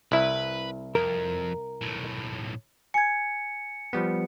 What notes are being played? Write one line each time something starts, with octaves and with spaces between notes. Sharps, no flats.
C2 E4 B4 E5
F2 A#4
B1 A2
G#5 G#6 C#7
F3 G3 B3